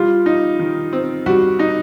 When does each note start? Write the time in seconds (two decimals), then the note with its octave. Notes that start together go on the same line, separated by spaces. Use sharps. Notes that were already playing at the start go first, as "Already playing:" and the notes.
Already playing: G3 F4
0.26 D#4
0.59 D#3
0.93 C4
1.26 G3 F#4
1.59 D#4